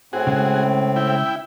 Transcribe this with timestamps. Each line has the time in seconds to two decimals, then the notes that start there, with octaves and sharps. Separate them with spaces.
0.13 A2 C4 F#4 G#4
0.27 C#3 G#3
0.96 E4 G5